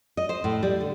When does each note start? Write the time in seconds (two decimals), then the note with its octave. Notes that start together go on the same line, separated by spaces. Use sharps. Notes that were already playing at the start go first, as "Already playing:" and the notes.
0.17 D#5
0.29 C5
0.44 A2
0.63 G3
0.81 D3